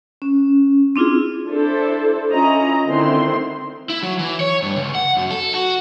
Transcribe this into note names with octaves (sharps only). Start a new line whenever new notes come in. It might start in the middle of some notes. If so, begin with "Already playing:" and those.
C#4
C4 D4 E4 F4 G#4
D4 E4 A4 C5
C#4 E4 F4 D#5 A#5
D3 D#3 C4 E4 C6
E4
F#3
E3
C#5
G2
C#2
F#5
F#2
A4
F#4